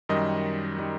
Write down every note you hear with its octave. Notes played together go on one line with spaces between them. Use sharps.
F#2 D#3 G3 D#5
D#3 G3